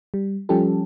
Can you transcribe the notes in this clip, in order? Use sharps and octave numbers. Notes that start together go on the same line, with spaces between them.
G3
F3 G3 C#4 G4 A4